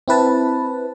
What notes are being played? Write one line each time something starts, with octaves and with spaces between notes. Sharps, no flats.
C4 E4 B4 A5